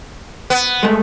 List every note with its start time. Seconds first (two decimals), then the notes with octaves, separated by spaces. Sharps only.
0.50 B3
0.83 G#3 A3